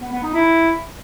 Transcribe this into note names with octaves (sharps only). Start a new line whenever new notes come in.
B3
B3
D#4
E4